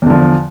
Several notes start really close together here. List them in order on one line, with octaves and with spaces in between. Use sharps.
E2 D3 F3